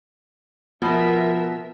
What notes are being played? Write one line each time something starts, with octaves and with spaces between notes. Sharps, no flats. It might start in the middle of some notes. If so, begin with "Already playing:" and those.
B2 F3 B3 F4 A#4 E5 B5